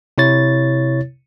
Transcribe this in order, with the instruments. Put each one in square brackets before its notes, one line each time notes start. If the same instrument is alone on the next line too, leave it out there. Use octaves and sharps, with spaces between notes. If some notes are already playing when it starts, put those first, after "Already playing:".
[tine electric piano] C3 E4 C#5 A6